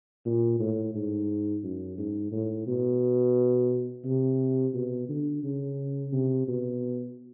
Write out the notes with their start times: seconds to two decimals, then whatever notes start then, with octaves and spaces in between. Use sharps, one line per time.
0.25 A#2
0.60 A2
0.95 G#2
1.63 F#2
1.98 G#2
2.32 A2
2.67 B2
4.05 C3
4.74 B2
5.09 D3
5.43 C#3
6.12 C3
6.48 B2